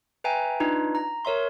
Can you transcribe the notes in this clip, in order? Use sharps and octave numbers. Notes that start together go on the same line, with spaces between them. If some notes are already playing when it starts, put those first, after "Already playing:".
B4 E5 G5 G#5 A#5
D4 D#4 F4 B4
A#5
A#4 C#5 E5 C6